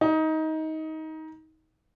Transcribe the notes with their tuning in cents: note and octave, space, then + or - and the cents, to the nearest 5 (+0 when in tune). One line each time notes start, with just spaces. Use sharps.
D#4 +20